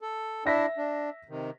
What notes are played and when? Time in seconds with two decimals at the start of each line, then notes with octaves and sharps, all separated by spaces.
0.01 A4
0.46 D4 E4 E5 A#6 B6
0.78 D4
1.29 C3 D#3